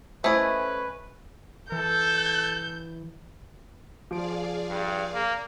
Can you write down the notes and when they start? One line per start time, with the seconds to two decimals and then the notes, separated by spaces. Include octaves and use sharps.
0.24 A3 C#4 E4 B4 C5 D#5 E5 G#5
1.72 E3 A4 G6
4.11 F3 G#4 D5 F5 D7
4.70 G2
5.14 A#3